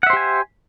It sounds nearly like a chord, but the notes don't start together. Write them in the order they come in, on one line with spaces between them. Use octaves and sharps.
F#5 E5 C5 G4 G#5